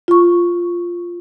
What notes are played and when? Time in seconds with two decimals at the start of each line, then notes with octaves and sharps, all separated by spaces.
0.08 F4 C#6